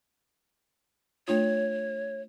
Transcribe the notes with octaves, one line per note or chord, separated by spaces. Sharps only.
A3 D4 F4 C#5